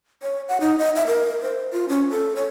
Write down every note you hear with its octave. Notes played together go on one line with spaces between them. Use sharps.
C#5
F#5
D#4
D#5
E5
A#4
C5
F4
C#4
A4
C#5